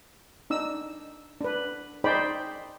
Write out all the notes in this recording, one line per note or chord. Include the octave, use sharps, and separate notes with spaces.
D4 D#4 E6
D4 B4
D#4 G#4 C5 D5 G5 B5